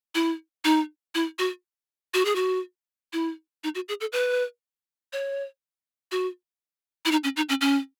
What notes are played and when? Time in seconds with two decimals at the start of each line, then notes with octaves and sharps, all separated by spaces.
0.15 E4
0.64 D#4
1.15 E4
1.39 F#4
2.14 F#4
2.25 G#4
2.36 F#4
3.13 E4
3.64 D#4
3.75 F#4
3.89 G#4
4.01 A4
4.13 B4
5.13 C#5
6.12 F#4
7.05 E4
7.11 D#4
7.24 C#4
7.37 D#4
7.49 C#4
7.61 C#4